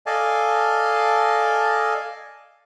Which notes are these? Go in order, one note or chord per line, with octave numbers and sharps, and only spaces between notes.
A4 D5 D#5 F5 G#5 A5